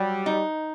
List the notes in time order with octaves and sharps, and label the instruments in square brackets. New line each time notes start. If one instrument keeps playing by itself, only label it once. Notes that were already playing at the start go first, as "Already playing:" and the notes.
Already playing: [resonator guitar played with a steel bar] F#3 [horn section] G3
[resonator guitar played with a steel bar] D#4